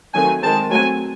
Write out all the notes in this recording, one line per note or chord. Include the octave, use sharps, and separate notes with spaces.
D#3 F#3 A3 C4 G#5
D#3 G#3 C4 A5
F#3 A3 C4 G#5